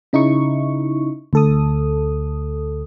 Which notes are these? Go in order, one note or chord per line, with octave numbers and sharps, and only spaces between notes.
C#3 D#4 E4 C#6
D2 A4 D#6